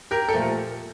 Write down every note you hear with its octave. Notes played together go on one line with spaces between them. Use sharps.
G4 A#4
A4
A#2 F3 A3